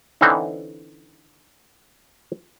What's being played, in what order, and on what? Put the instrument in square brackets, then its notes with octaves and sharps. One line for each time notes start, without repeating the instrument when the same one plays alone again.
[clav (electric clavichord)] D3 E3 C4 C#4 D#4